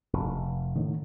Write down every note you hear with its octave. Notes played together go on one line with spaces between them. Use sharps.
F1
A2 D3 D#3